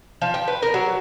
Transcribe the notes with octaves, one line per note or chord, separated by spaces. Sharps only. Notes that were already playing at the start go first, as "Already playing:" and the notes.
F3
G5
B4
A#4
F#3